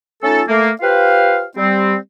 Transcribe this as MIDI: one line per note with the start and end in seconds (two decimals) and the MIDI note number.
0.23 0.42 57
0.23 0.42 61
0.23 0.42 63
0.23 0.42 65
0.23 0.42 69
0.48 0.71 57
0.48 0.71 58
0.81 1.44 65
0.81 1.44 67
0.81 1.44 71
0.81 1.44 72
0.81 1.44 77
1.57 1.96 55
1.57 1.96 60